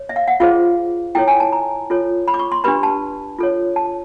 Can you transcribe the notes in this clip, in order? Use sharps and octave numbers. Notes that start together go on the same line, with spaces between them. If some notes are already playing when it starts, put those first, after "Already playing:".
Already playing: C#5
E5
F5
F#5
F4 G#4 C5 F5
E4 A4 C#5 G5
G#5
A5
A#5
F4 A4 C#5
B5
D6
C#6
C6
D4 G4 B4 B5
A5
F4 A4 C#5
A5